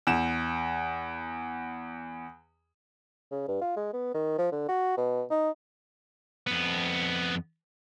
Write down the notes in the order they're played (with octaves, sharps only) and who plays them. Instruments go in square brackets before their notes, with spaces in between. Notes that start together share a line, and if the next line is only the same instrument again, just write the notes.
[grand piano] E2 E7
[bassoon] C#3
G2
F4
G#3
B3
D#3
F3
D3
F#4
B2
D#4
[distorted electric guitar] F2 B3